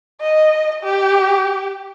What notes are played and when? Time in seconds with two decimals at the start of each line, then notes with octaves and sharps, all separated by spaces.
0.21 D#5
0.84 G4